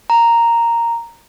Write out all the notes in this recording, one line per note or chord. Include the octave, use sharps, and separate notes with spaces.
A#5